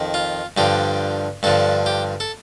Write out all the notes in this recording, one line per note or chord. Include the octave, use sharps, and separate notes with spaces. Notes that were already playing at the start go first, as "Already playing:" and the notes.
Already playing: F2 D#3
F4
G2 D3 F3 G4
G2 D3 F3 A4
G4
A4